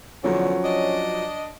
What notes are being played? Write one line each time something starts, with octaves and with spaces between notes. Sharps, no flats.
E2 D3 F3 F#3 C#4
D4 D5 D#5